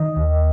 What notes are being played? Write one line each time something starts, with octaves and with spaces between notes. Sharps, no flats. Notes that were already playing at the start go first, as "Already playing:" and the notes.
Already playing: D#3 D#5
D#2